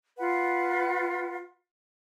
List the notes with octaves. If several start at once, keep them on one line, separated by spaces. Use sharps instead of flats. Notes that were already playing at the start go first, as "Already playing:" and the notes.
F4 B4 F#5